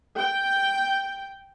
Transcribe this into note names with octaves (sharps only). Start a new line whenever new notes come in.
G5